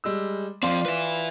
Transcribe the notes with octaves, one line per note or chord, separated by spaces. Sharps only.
G3 G#3 E6
F3 C4 F4 D5 C6
B4 E5